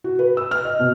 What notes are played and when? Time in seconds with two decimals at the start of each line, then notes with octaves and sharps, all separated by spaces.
0.04 F#4
0.19 B4
0.37 E6
0.51 F6
0.65 D#5
0.79 B2